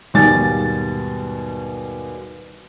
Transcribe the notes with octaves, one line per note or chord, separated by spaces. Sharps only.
D#2 G#2 B2 G3 G#5 A6